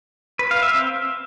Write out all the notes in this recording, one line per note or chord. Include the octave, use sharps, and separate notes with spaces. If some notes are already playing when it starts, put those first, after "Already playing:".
B4
F5
E5
C4